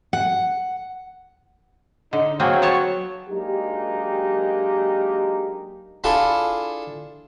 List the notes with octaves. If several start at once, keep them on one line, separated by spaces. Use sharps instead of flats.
F#5
D3 D#4
F#3 A#3 C4 G#4
B3 C#5 A5
F#3 G#3 A#3 D4 D#4 G4
D4 E4 F4 G#4 A4